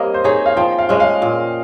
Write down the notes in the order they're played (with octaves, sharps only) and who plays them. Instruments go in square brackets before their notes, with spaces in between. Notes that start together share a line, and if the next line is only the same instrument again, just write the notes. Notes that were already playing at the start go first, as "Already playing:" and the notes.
Already playing: [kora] G3 A#3 C4 [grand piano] C#5 D#5
[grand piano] C5
[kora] D#4 G#4 [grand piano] C#5
[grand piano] F5
[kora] F3 [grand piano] G5
[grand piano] F5
[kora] G#3 C#4 [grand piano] D#5
[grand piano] F5
[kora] A#2